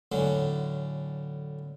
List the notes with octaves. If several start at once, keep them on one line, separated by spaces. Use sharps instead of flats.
A2 D3 F#3 C#4